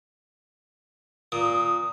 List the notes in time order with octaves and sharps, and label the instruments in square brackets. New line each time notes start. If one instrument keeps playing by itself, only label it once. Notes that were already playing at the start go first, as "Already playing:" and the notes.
[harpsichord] A#2 [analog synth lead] D#6